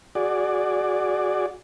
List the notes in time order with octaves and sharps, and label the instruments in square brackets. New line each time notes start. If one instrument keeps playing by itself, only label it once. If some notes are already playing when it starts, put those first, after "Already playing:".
[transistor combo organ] F#4 G#4 D5